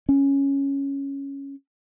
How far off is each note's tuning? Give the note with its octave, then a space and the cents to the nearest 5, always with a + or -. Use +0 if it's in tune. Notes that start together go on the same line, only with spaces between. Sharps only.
C#4 +0